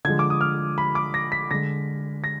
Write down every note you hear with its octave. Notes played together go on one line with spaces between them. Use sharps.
D3 F3 G#3 G#6
D6
D#6
F6
B5
D6
A#6
B6
D3 G#3 A#6
A#6